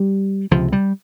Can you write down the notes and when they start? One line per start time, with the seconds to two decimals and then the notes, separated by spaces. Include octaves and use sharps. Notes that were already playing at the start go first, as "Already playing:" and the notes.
Already playing: G3
0.51 C#2 C3 F3
0.73 G3